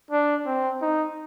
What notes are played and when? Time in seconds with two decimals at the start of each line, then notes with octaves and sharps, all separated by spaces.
0.11 D4
0.46 C4
0.81 D#4